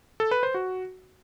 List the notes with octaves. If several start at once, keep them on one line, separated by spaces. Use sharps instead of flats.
A4
B4
C5
F#4